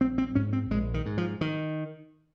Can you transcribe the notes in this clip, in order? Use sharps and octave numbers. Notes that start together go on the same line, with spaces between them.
A#1 C4
C4
G#2 C#4
C4
A#1 G#3
D#3
G#2
F3
D#3